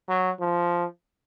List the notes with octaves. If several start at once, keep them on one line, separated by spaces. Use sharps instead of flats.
F#3
F3